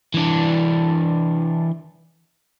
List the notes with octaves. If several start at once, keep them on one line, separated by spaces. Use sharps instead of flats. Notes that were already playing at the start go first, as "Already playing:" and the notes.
E3 D4